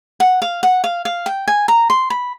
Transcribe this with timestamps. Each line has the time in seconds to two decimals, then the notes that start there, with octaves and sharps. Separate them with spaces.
0.20 F#5
0.42 F5
0.63 F#5
0.84 F5
1.05 F5
1.26 G5
1.48 G#5
1.68 A#5
1.90 C6
2.10 B5